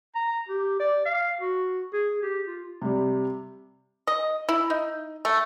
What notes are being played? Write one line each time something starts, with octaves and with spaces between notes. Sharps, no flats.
A#5
G4
D5
F5
F#4
G#4
G4
F4
C3 G3
D#5
E4
D#4
A3